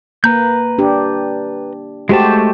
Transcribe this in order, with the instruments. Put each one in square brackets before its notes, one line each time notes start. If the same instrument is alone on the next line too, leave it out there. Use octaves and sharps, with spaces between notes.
[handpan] A#3 [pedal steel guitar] B4 A#5 G6
[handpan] D4 G4
[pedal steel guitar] G#3 A3 A5 [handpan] F#4 G4 C5